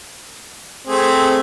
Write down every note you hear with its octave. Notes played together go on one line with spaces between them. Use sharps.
A3 C4 G#4